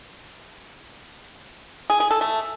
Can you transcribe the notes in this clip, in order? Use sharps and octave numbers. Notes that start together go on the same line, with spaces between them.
G#4
G#4
A4
A3